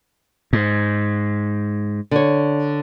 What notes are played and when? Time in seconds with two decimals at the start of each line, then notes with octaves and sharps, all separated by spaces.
0.53 G#2
2.11 D3 C#5